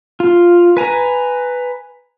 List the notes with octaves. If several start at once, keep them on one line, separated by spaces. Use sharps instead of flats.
F4
B4 G#5 A#5